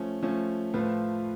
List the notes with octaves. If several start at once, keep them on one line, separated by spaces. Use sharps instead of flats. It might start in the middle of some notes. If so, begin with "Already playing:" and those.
Already playing: F3 A3 C#4
F3 A3 C#4
A2 F3 A3 F4 B4